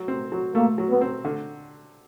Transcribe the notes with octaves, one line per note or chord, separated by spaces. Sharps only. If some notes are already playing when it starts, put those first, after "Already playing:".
Already playing: F#3
C4
F#3
A3 A#3
F#3
B3
C4
D3